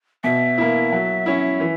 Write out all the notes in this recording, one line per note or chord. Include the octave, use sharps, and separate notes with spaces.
B2 E5
A#3 E4
F#3
C#4 E4
E3